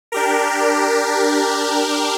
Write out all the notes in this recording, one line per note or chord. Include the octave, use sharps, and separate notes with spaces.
D4 G4 A#4